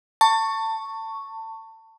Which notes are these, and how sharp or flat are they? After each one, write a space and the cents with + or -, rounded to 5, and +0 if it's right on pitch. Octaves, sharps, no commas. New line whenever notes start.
A5 +25 C#6 +0